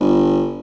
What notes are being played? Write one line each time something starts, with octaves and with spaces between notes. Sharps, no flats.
G1